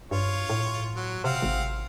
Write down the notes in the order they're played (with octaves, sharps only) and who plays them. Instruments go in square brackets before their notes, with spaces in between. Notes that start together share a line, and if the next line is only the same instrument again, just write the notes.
[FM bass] G2 [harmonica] F4 C#5
[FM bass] A2
[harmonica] F#3
[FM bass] C3 [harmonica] C4 F5 F#5
[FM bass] G#1